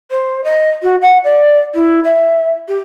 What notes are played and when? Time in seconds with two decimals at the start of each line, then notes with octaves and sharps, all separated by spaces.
0.10 C5
0.44 D#5
0.82 F#4
1.01 F#5
1.24 D5
1.74 E4
2.04 E5
2.68 G4